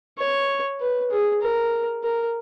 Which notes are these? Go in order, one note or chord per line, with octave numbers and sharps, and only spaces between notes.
C#5
B4
G#4
A#4
A#4